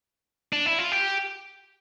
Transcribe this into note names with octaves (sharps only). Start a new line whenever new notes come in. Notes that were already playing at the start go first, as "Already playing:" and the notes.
D4
E4
F4
G4